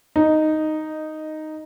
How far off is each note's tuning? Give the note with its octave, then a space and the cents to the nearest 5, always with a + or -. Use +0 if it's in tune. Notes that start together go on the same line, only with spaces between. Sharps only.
D#4 +0 D#5 -15